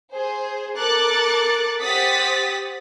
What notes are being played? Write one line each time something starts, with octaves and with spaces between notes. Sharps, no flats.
G#4 C5
A4 A#4 D6 F#6 A6 C#7
G4 C5 F#5 D#6 A6 B6